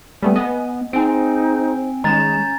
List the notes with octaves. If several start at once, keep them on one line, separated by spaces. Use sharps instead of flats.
G3 A3 B3 G#5
B3 D#5
C4 D#4 G#4 C5 G#5 D7
D#3 G#3 C#4 A#5 G6 A6 E7